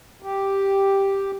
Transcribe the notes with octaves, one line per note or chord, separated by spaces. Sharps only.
G4